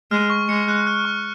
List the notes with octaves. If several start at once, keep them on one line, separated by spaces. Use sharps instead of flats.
G#3 F6
C#6
G#3 C#7
F#6
F6
C#6